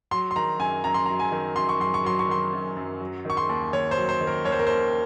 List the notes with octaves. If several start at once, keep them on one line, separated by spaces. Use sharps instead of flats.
F#3 C6
C6
D#3 A#5
F#2 G#5
F#2 A#5
C6
F#3 A#5
G#5
D#3
F#2 C6
C#6
F#2 C6
C#6
F#3 C6
C#6
D#3 C6
F#2
F#2
F#3
D#3 C#6
C6
D#2
D#2 C#5
C5
F#3
C5
D#3
A#4
D#2 C#5
C5
A#4
D#2 C5